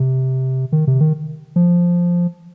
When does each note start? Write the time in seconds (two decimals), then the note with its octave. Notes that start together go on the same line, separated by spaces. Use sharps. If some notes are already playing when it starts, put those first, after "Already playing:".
Already playing: C3
0.72 D#3
0.87 C3
1.00 D#3
1.56 F3